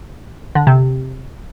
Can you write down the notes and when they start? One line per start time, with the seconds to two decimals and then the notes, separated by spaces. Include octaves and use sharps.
0.55 D3
0.67 C3